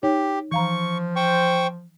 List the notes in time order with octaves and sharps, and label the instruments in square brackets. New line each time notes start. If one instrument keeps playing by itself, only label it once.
[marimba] D#4 C#5 [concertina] G4
[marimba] E3 F5 A#5 [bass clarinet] F3 [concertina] C#6
[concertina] C5 G5 C#6